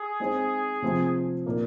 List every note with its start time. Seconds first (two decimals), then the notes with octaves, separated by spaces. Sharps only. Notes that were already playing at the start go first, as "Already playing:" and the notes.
Already playing: G#4
0.20 G#3 C4 D#4 C5
0.82 C3 F3 C4
1.46 A#2 A#3 D#4 A#4